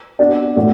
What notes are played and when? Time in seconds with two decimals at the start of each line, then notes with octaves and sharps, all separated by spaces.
0.19 B3 D4 F#4 D5
0.56 A2 A3 F#4 D5